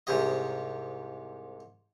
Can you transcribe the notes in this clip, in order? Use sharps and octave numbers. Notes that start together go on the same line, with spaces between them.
C2 G#2 C3 G4 D#5